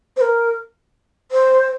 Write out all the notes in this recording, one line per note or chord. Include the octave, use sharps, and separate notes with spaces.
C5
A#4
C5